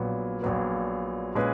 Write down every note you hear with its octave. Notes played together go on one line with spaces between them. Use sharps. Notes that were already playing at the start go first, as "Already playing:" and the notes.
Already playing: A#1 A#2 F#3 B3
A#1 A#2 F#3 B3
A#2 G#3 C#4 G#4 B4